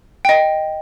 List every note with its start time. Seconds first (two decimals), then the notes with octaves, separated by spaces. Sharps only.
0.25 D#5 G5